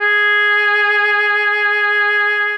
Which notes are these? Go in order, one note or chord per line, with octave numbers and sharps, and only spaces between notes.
G#4